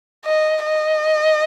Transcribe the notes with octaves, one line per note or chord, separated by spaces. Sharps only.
D#5
D#5